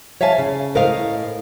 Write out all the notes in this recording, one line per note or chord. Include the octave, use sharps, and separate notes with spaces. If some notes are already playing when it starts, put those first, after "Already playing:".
C#5 E5 F5 G#5 A5
C#3
A2 A#4 C5 D#5 F5